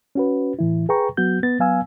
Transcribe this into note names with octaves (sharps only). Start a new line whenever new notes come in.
C#4 F#4 B4
A2 E3 E4
G#4 B4 G5 A#5 C#6
F#3 B3 F#4 G6
B3 A6
F#3 B3 F5 G#5 E6